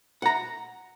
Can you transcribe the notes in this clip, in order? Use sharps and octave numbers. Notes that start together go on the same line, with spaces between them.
F#5 A#5